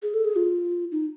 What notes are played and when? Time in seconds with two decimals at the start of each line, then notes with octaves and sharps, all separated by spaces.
0.03 G#4
0.14 A4
0.25 G#4
0.36 F4
0.92 D#4